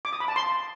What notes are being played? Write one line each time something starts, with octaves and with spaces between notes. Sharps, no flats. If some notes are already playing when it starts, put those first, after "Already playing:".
D6
D#6
B5
A5
C6